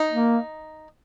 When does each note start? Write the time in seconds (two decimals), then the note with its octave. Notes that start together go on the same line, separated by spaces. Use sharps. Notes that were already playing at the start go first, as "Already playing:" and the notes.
Already playing: D#4
0.11 A#3